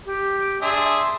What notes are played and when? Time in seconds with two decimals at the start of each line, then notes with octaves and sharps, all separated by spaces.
0.05 G4
0.62 D4 G#4 E5 C6